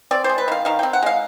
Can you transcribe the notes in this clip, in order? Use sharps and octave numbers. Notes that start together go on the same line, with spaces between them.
C4 D5
C5
G#3
B4
D#3 F5
D#3 F5
C4 G5
F#5
G#3 F5